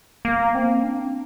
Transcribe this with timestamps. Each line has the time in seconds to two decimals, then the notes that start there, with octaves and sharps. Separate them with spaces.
0.25 A#3
0.55 C4
0.83 D4